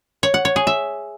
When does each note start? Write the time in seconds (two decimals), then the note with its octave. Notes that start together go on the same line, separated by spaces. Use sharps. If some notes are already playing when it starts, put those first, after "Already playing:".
0.23 C#5
0.34 F#5
0.45 C#5
0.56 G#4
0.67 E5